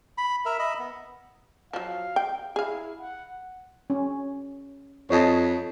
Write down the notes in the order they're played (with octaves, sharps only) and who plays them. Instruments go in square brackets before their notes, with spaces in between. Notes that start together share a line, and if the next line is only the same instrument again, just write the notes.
[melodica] B5
A#4 E5
D#5 E5 B5
B3
[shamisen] F3 F#3 [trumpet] F5
[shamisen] G5
[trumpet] E4 [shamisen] G#4 F5
[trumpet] F#5
[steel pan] C#4
[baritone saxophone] F2 [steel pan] C#5 D#5 A5